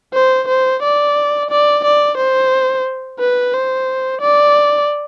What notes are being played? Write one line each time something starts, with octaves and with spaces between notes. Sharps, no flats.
C5
C5
D5
D5
D5
C5
B4
C5
D5